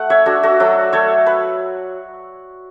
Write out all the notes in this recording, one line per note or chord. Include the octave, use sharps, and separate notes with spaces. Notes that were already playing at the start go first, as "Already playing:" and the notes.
Already playing: A3 F#5
C#5 E5
D4 F#4 A4
F#4 A4
F#3 F#4 A4
A3 A4 C#5
B4